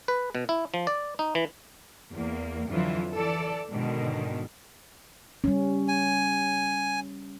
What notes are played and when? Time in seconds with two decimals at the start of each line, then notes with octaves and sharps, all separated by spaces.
0.08 B4
0.35 B2
0.49 E4
0.74 F3
0.87 D5
1.19 D#4
1.35 E3
2.14 E2 A#3
2.70 F2 D3 E3 F#3 E4 F4
3.12 E3 A4 D5
3.70 G#2 B2 D3 D#3
5.44 G3 C#4
5.88 G#5